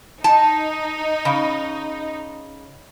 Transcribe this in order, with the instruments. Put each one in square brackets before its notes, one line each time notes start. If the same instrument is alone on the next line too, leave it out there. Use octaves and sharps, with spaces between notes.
[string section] D#4 [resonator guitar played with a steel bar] A5
[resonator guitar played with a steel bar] C#3